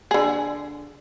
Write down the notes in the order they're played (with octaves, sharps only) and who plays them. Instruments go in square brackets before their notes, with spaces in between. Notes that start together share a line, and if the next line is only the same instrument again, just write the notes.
[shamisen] D3 G#4